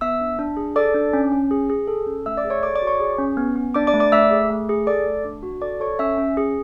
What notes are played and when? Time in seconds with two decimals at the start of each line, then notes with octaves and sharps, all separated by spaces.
0.01 B3 E5 E6
0.20 D4
0.39 D4
0.57 G#4
0.76 A4 D5 D6
0.94 D4
1.13 C#4
1.32 C#4
1.51 G#4
1.70 G#4
1.88 A4
2.07 C#4
2.26 A3 E5 E6
2.37 D5 D6
2.45 G#4
2.50 C#5 C#6
2.63 A4 D5 D6
2.76 D5 D6
2.82 F#4
2.87 C#5 C#6
3.00 G#4
3.18 C#4
3.37 B3
3.56 B3
3.74 D4 D5 D6
3.87 D5 D6
3.94 A3
4.00 D5 D6
4.12 A3 E5 E6
4.31 G#4
4.50 A3
4.69 G#4
4.87 A4 D5 D6
5.06 A3
5.25 D4
5.43 F#4
5.61 A4 D5 D6
5.80 A4 C#5 C#6
5.99 C#4 E5 E6
6.18 C#4
6.37 G#4